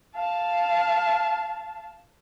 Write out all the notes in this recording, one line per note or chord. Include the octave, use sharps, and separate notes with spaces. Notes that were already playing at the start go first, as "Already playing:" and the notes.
F5 A5